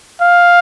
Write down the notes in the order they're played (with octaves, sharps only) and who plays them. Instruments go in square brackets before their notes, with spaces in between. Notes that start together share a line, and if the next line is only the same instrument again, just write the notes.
[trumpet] F5